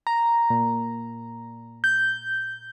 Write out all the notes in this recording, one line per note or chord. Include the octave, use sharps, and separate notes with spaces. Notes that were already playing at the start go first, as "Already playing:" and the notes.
A#5
A#2
G6